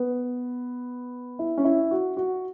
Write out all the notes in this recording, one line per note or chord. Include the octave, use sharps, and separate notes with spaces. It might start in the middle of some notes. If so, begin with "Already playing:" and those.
Already playing: B3
E4
C#4
E4
F#4
F#4